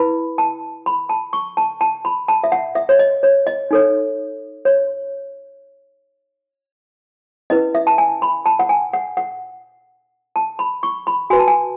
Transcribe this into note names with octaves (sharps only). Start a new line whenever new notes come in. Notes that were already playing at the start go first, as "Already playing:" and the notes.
Already playing: E4 B4 B5
A5
B5
A5
C#6
A5
A5
B5
A5
E5
F#5
E5
C#5
D#5
C#5
D#5
D#4 A4 C#5
C#5
C#4 E4 B4 D#5
E5
A5
G#5
B5
A5
F#5
G#5
F#5
F#5
A5
B5
C#6
B5
F#4 B4 G#5
A5
G#5